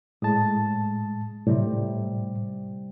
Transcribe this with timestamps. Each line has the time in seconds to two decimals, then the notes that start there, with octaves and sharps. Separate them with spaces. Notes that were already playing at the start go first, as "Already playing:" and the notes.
0.22 A2 G#3 A5 D#6
1.46 A2 C3 G3